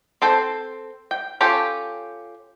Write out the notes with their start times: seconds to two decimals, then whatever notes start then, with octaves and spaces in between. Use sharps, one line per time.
0.22 C4 A4 C5
1.11 G5
1.41 C#4 F4 G4 A4